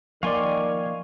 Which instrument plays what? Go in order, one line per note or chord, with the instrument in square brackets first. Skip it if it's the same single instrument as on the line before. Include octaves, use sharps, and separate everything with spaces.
[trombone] D#3 [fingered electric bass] F3 A#3 [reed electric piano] D5 C#6 [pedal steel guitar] F5 G#5 C6